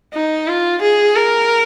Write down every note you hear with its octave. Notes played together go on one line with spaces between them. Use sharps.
D#4
F4
G#4
A#4